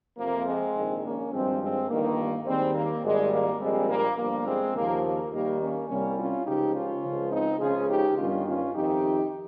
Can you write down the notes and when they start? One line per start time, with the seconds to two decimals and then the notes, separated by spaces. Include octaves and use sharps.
0.18 F2 C3 F3 A#3
0.46 G#3 C4
0.75 A#1 G#2 D#3
1.03 A#3 C#4
1.31 G#1 G2 F3 G#3 C4
1.60 G#3 C4
1.88 G1 G2 D#3 A#3
2.45 D#2 D#3 G3 G#3 C4
2.74 A#3
3.03 G#1 G#2 G3 G#3
3.32 A#3
3.59 A#1 A#2 G3 G#3 C4
3.88 A#3
4.17 G1 G2 F3 A#3
4.45 G#3 C4
4.74 D#2 C#3 F3 A#3
5.03 A#3
5.31 D#2 D#3 G3 A#3
5.59 A#3 C#4
5.88 C2 C3 G3 A#3 C#4
6.17 C#4 F4
6.45 C#2 C#3 F3 D#4 G4
6.73 C#4 F4
7.03 C#2 C#3 F3
7.31 C4 D#4
7.59 C#2 C#3 F3 F4 G#4
7.88 D#4 G4
8.16 G1 G2 D#3 C#4 F4
8.45 C#4 F4
8.73 F2 C3 D#3 D#4 G4